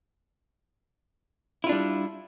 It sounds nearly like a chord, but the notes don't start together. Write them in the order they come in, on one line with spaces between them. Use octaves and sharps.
E4 F4 D4 G3